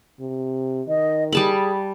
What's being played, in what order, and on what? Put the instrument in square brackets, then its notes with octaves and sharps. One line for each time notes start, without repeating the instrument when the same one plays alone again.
[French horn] C3
[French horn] D#3 [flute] D#5
[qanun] G3 A5 B5 [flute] G#4